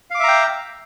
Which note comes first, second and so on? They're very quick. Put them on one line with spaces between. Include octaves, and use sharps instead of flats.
F5 D6 E5 A#5 G5